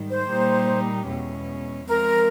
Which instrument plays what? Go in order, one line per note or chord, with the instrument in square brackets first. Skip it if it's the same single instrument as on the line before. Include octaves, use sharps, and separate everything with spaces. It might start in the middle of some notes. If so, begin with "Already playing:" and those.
Already playing: [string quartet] G#2 D#3 G3
[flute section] C5
[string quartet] A#2 G3 A#3 D#4 G4
E2 B2 G#3 C#4
[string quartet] F3 G#3 C4 F4 [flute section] A#4